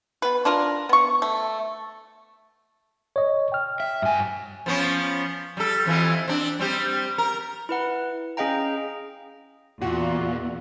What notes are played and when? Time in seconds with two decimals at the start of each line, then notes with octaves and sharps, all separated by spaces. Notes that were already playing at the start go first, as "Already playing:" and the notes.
0.22 B3 B4
0.45 D4 F4 A#4
0.89 B3 C#6
1.22 A3
3.16 C#5 D#5
3.52 G5 F6
3.80 E5
4.02 G2 G#5
4.66 F3 B3 C#4
5.57 G3 A4
5.86 F2 E3 F3
6.28 C4 D4
6.59 G3 C4 G4
7.18 A#4
7.69 E4 B4 F#5
8.37 C#4 G#4 D#5 F5 G5 A#5
9.82 E2 A#2 F4 F#4